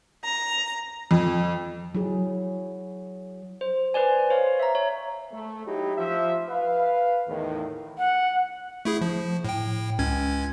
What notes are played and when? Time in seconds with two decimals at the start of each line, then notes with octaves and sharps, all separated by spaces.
0.24 A#5
1.11 F2
1.95 F#3 E4 G#4
3.61 C5
3.94 B4 C5 D5 G#5
4.30 C5 C#5 F5
4.59 E5 A#5
4.75 C#5
5.32 A3
5.66 F#3 D#4 E4 G4
5.97 F3 E5
6.49 B4 F5
7.28 E2 A2 D#3
7.98 F#5
8.85 A3 E4 G#4
9.01 F3
9.44 A2 G5
9.99 C#2 C#4 G#6